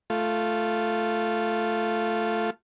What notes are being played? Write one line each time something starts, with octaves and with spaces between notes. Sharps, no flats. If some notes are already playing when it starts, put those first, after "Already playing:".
A3 F4